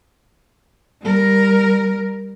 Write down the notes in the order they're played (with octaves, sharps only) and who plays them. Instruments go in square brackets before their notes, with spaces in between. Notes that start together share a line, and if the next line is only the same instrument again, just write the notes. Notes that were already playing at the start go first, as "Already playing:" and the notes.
[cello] G3 A#4